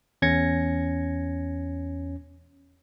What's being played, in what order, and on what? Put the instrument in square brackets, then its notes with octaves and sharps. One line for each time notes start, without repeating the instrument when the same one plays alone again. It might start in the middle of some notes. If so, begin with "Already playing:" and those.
[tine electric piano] E2 C#4 G#6 A#6 C#7